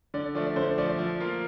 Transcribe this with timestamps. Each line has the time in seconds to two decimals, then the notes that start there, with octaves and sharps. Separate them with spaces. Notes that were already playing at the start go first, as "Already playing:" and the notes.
0.14 D3 D5
0.35 F3 A3 D5
0.56 D3 C5
0.78 F3 A3 D5
0.99 F3
1.20 A#3 F4